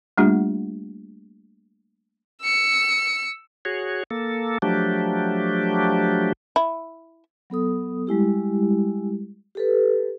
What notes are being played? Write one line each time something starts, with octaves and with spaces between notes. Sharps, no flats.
G3 A3 A#3 D4 F4 G4
E6 C#7
F#4 G#4 C#5
A#3 A4
F3 F#3 A3 D4 G4
E4
F#3 B3 A4 D#6
G3 G#3 E4 G4
G4 A4 B4